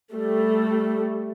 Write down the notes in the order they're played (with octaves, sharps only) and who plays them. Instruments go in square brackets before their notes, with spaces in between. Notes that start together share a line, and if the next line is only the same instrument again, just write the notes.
[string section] G3 A3